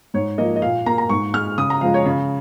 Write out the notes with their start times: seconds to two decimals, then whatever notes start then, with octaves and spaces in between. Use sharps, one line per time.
0.14 G#2 C#5
0.38 F3 A#3 D#5
0.56 D#5
0.62 A#2 F5
0.86 A#3 A#5
0.98 A#5
1.09 G#2 C#6
1.34 G#3 F6
1.57 C#3 D#6
1.70 A#5
1.81 F3 G#3 F5
1.94 C#5
2.06 C#3